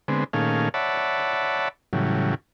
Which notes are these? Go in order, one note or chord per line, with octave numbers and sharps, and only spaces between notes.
D3 G#3 B3 C4
A#2 D#3 A3 C#4 G#4 F5
C#5 D5 E5 F#5 A5 B5
A2 C#3 E3 F#3 G3